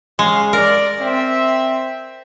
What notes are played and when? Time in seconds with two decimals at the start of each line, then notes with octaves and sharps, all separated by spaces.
0.19 C#3 G#3 C#5 F5
0.53 A#4 D5
1.00 C4 E5